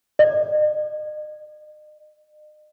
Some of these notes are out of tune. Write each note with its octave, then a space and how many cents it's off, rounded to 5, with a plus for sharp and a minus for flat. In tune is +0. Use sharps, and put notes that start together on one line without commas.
D#5 -40